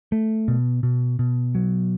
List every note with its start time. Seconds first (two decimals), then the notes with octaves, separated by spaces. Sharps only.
0.12 A3
0.48 B2
0.83 B2
1.19 B2
1.55 F#3